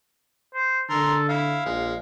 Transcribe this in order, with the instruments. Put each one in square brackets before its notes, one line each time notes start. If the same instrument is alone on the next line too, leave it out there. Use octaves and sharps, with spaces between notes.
[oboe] C5
[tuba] D3 [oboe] A4 [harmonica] A#4 C6
[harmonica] E4 [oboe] F5
[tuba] A#1 [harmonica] G#3